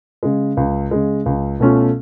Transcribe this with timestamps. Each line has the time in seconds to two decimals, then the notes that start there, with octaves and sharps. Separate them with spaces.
0.23 C#3 G#3
0.57 C#2
0.91 C#3 G#3
1.26 C#2
1.60 B2 A3 C#4 F4